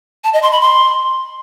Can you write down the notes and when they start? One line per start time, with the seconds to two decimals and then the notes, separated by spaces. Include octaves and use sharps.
0.24 A5
0.33 D#5
0.42 C6
0.52 B5
0.61 C6